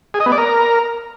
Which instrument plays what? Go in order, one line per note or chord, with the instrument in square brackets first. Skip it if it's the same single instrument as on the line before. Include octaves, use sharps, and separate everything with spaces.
[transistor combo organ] G#4
D#5
B3
D5
A#4